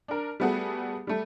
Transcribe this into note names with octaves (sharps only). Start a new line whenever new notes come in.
D4 A#4
G3 A3 B3 F#4 G#4 A4
G3 A3